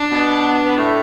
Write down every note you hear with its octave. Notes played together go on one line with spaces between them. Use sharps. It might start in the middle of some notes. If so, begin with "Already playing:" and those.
Already playing: D4
B2 B3
B3
A2 A3